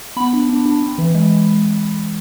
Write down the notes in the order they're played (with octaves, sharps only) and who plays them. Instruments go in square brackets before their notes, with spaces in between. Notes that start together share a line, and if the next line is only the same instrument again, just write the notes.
[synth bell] B3 B5
D4
D4
D4
C4
E3
G#3